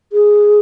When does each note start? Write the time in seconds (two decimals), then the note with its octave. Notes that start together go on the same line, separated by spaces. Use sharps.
0.13 G#4